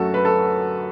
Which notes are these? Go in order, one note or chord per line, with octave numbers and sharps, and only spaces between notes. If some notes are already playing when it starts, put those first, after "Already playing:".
Already playing: F#2 F#3 A3 C#4 F#4 A4
B4
A4